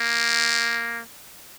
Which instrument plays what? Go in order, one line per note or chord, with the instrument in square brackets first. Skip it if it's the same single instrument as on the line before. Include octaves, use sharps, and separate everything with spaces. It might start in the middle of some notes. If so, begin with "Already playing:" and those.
Already playing: [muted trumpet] A#3